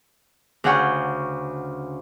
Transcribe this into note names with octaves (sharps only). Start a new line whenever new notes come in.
D2 C#3 G#4 F#5 G5 C#6